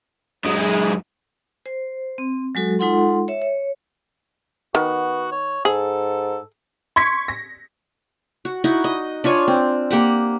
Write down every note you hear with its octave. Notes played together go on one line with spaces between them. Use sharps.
F#2 F#3 G#3 D#6
E4 G#4
C5
C4
F#3 G#3 F#4 A4
G#3 D#4 F4 A4 F#5 C6
C#5 E5
C#5
D#3 B3 F#4
C#5
G#2 G#4 A4
C6 C#6 G#6 B6 C#7
A#6
F#4
D#4 E4 F#4
D#5
D4 F4 C#5 G#5
C4
A#3 G4 F#5